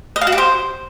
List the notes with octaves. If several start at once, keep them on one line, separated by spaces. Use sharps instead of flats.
D#5
F5
F#4
G4
C5